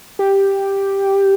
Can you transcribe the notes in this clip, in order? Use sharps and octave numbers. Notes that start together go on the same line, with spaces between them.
G4